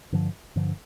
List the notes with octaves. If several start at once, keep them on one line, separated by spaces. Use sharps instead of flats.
G2 D3 F3
G2 D3 F3